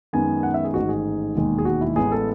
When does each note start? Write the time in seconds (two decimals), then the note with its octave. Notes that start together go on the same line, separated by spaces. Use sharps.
0.13 F#2 D#3 G#3 B3 G#5
0.43 F#5
0.54 E5
0.64 G#4
0.74 A1 G#2 D#3 F#4
0.89 G#4
1.35 E1 D#2 D#3 G#3
1.58 G#4
1.65 F#4
1.81 E4
1.96 A1 A2 G#3 B3 G#4
2.12 A4